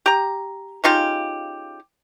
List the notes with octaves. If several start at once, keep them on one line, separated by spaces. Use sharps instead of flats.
G4 A#5
C#3 D#4 F4 G4